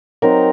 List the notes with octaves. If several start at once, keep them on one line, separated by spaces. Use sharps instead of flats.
F#3 C4 D#4 A#4